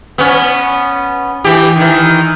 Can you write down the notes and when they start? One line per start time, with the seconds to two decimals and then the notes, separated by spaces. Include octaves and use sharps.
0.18 B3 C#4
1.44 E3 G4
1.76 D#3 E3